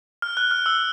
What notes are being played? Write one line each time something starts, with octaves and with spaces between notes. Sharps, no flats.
F6
F#6
F6
E6